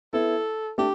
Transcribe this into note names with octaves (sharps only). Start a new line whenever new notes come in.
B3 E4 A4
A3 D4 G4